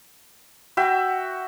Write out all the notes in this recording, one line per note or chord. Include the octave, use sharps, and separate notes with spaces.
F#4 E5 G5